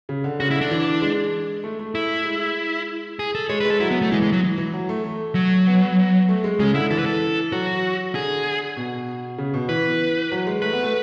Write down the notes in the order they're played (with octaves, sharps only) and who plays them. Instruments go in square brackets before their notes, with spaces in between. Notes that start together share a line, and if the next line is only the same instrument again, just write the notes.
[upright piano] C#3
D3
[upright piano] C#3 [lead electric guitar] F#4
[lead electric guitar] E4
[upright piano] D3
[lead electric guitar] D4
[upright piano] E3
G#3
A3
A3
[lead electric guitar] E4
[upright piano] G#3
[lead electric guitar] G#4
A4
[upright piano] G#3 [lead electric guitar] C#5
[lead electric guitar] B4
[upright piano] G#3
[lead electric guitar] A4
[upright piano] F#3 [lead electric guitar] E4
[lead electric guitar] B3
A3
[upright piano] E3 [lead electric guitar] G#3
[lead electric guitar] G#3
F#3
[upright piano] E3
E3
F#3
A3
A3
[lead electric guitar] F#3
[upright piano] B3
A3
G#3
[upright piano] C#3 [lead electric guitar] G#3
[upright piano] D3 [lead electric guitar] E4
[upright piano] E3 [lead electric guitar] A4
[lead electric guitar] B4
A4
[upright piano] F#3 [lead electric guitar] F#4
[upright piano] D3 [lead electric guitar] G#4
[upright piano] B2
C#3
B2
[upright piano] E3 [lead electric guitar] B4
[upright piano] F#3
G#3
[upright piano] A3 [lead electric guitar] B4
[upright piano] B3
A3